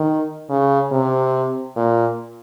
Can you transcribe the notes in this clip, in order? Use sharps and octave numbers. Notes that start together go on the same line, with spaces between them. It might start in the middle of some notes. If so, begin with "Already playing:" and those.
Already playing: D#3
C#3
C3
A#2